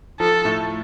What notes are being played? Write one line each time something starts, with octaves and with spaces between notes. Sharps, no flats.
F3 A4
A2 A3